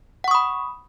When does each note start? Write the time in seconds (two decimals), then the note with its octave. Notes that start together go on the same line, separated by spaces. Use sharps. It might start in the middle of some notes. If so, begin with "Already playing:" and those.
0.24 F#5
0.28 C#6
0.31 D#6
0.35 B5